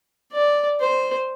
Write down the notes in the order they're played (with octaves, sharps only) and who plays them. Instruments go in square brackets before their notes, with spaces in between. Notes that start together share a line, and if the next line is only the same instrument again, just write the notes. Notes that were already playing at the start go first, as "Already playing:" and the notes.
[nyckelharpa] D5
C5